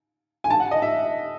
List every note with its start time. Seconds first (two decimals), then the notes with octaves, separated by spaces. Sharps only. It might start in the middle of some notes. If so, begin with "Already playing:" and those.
0.44 G#5
0.50 A5
0.60 F#5
0.71 D#5
0.82 E5